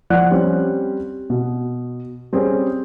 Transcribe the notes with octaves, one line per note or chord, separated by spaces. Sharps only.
F3 D5 F#5 F#6
G3 C4 C#4
B2
G3 C4 C#4 G#4